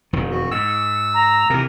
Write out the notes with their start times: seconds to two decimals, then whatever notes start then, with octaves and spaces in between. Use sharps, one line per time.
0.13 E1 F2 D#3
0.30 F#4
0.51 G#2 E6
1.14 A#5
1.50 C3 E3 A#4